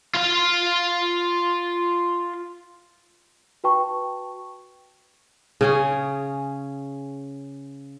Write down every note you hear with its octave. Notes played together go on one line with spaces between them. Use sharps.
F4 F5
F#4 B4 G5 A5 C#6
C#3 C#4 G#4